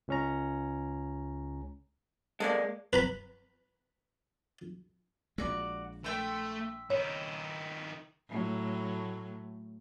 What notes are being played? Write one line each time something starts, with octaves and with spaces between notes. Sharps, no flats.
C#2 C#4 A#5
G#3 A#3 A4 C#5 D5
B4 A#5 B5
A#1 G#3 F#4 D5
A3 E5 G5 C6
D#3 E4 C#5
A2 F#3 A3